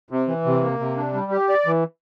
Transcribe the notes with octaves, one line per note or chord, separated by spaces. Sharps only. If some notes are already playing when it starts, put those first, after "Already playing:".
C3
E3
C3
A#3
C3
D4
G3
G4
D5
E3